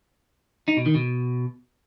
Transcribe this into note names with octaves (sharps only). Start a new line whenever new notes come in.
D#4
B2
D#3
B2